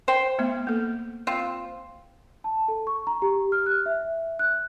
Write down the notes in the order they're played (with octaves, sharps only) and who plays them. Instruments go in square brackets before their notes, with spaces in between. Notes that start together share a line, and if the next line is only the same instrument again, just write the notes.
[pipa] C5 G5
[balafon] A3 B3 E5
A#3 A4
[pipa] C4 F4
[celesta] A5
A4
C#6
A#5
G4
F6
F#6
E5
F#6